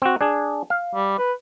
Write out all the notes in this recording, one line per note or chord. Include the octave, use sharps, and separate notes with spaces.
C4 F#4
D4 G#4
F5
G3
B4